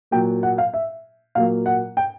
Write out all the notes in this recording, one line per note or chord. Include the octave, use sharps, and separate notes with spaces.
A#2 F#3 A#3 G5
F#5
F5
E5
A#2 F#3 A#3 F5
F#5
G5